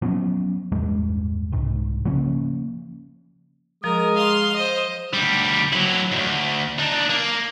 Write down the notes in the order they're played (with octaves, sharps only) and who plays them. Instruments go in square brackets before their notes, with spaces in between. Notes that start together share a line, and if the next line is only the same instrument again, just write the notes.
[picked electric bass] F3 F#3 B3 C#4
A1 E2 G2 G#3
C2 G#2
C#3 F3 A#3 C#4
[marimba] F3 [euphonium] G#3 [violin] A#4 [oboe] D#6
[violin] F5 C6
[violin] C5 D#5 [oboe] D#6
[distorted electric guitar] D2 G3
F#3 E4
D2 G#2
D4 D#4
A#3